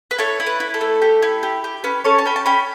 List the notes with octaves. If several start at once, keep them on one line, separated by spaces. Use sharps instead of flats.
B4
E4 A4 C#5
E4
B4
E4
A4
A3
G4
E4
G4
G4
C#4 B4
C#4 A4 C#5
A5
C#4 G5 B5
A5
C#4 G5 B5